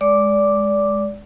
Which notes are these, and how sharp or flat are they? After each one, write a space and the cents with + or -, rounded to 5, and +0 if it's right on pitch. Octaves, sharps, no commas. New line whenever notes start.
G#3 +0 D5 -20 D6 +0